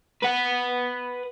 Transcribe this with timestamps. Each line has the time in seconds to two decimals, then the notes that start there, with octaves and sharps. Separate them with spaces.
0.22 B4 F#5